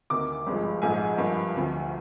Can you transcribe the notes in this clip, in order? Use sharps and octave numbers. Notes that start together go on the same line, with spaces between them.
D2 C3 D#3 A#3 D6
G#1 G2 F3 G#3
A#1 G#2 F3 G#3 G#5
G2 F3 A#3
D2 C3 F3